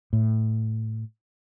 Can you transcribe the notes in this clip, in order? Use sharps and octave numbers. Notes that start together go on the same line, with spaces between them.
A2